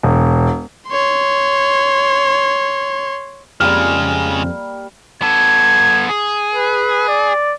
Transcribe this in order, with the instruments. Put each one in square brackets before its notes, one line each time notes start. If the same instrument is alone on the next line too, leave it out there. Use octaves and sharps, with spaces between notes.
[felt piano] E1
[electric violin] C#5 C6
[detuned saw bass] F2 [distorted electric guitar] C#3 G#3 [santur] G3 A#3 G4 [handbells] F6
[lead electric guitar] B3 A4 [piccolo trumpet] G#6
[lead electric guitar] G#4
[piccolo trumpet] B4
D5